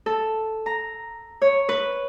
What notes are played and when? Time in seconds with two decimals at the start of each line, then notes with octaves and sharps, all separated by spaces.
0.06 A4
0.66 A#5
1.42 C#5
1.69 B4